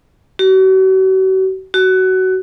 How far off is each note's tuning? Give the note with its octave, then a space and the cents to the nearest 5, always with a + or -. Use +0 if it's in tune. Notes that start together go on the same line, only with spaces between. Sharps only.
F#4 +40
F#4 +20